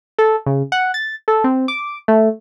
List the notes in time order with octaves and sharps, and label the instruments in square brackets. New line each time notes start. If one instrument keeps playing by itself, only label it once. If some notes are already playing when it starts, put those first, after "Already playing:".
[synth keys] A4
C#3
F#5
A6
A4
C4
D6
A3